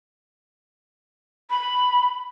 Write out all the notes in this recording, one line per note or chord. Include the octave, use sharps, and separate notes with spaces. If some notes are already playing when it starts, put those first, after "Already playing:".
B5